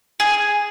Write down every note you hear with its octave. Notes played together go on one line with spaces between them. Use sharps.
G#4